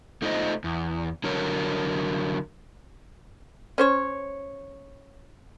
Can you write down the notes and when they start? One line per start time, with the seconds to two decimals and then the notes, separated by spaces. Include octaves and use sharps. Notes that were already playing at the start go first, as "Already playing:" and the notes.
0.22 A3 D#4 F4 C5 D#5
0.64 E2
1.24 D3 F#3 A#4 C#5
3.78 C#4 C5 C#5